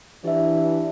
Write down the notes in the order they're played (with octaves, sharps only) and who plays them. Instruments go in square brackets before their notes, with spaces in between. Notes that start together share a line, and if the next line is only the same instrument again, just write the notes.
[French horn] E3 [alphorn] D4 [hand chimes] G4 E5